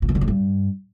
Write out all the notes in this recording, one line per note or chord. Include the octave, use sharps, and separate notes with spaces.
A#2
B2
D3
A2
G2